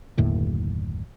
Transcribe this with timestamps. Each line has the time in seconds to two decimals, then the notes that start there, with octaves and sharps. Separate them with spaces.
0.17 F#1 D#2 A2 D3